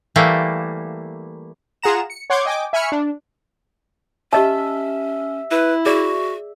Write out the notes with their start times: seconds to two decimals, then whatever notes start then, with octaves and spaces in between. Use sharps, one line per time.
0.16 E3 G3 A3 A#3
1.83 F4 G#4 F#5 A#5 E7
2.10 C#7
2.30 C#5 F#5 C6 D6 G6 G#6
2.46 D#5 G5 G#5 D6
2.73 E5 G#5 B5 C#6 F6 C#7
2.92 D4
4.33 C#4 G4 D#5 E5 A5
5.51 E4 B4
5.86 F#4 G#4 D5